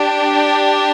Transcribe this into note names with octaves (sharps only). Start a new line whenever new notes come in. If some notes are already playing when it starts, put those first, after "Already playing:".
Already playing: D4 G4
G5